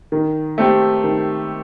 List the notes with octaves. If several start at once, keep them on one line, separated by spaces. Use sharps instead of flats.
D#3
A3 C4 G4
D#3